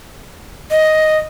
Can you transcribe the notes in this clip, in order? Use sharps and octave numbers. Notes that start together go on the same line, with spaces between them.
D#5